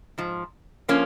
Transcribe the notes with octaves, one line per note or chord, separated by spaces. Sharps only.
G#2 F3
F3 A#3 C#4